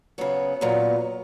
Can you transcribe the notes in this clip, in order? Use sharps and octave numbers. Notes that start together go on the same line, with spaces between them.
C#3 F#3 B3 C#5
A#2 F#3 B3